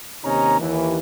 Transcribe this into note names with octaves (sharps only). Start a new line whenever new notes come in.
D#2 C3 C#4 D#4 A#5
D#2 E3